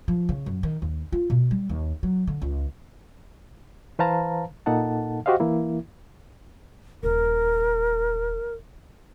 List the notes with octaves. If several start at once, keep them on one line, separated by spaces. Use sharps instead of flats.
F3
C#3
F#2
D#3
D#2
F4
B2
G3
D#2
F#3
D3
C#2
E3 B4 C5 F5 A5 A#5
A#2 A#3 D#4 A4 F#5 A5
F#4 G4 C5 D#5 F5
E3 A#3 E4
D#1 F4 A#4